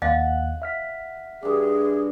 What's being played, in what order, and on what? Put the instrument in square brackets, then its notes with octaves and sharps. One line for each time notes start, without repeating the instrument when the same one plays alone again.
[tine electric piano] D#2 [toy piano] D#5 F5 [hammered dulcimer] F#5
[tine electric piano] E5 F6 B6
[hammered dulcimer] G2 D4 [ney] G#4